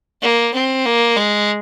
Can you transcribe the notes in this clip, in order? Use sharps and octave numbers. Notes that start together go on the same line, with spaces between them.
A#3
C4
A#3
G#3